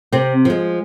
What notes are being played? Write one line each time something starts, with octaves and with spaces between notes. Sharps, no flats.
C3 C4
F3 G#3